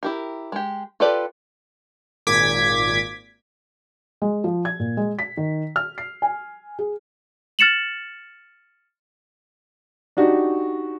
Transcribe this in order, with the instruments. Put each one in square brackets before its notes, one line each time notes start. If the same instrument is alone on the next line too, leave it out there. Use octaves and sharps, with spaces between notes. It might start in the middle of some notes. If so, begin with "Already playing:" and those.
[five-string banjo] E4 G4 A#4
G#3 G4
F4 G4 A4 B4 D5
[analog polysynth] G#1 A#2 D6 G#6 B6
[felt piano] G#3
F3
G#6
A#2
G#3
B6
D#3
F6
C7
G#5
G#4
[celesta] F6 A6 C#7 E7 F#7
[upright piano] D4 D#4 F#4 G4